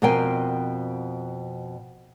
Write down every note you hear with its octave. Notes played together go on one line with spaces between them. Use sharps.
F2 B2 A#4 C5 G5 G#5